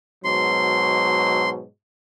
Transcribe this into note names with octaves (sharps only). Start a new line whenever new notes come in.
G#2 B2 F#3 C6